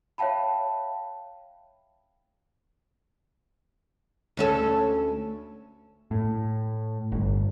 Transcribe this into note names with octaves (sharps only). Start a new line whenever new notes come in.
C#5 E5 F5 G5 A5 B5
D2 C#4 A4
A2
G1